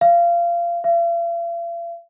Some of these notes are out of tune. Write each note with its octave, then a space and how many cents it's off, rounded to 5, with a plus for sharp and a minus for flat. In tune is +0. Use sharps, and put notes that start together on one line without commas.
F5 -25
F5 -45